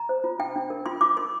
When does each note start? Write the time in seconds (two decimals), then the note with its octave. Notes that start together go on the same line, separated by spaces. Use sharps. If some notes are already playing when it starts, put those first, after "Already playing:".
Already playing: A#5
0.09 C5
0.24 F4
0.39 D4 G5
0.56 D4
0.70 A#4
0.86 F4 C6
1.01 F4 D6
1.17 A#4 C6